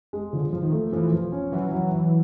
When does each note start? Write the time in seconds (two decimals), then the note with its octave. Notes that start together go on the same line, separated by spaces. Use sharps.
0.13 G#3
0.33 D3 F3
0.53 F3
0.62 D#3
0.73 A3
0.92 E3 F3
1.12 F3
1.32 C#4
1.52 E3 F#3
1.72 F#3
1.91 F#3